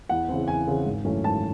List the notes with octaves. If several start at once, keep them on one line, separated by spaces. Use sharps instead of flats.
E2 F#5
C#3 E3 C4
E2 G#5
C#3 E3 C4
G#1
F#2 E3 A3 C#4
G#1 A5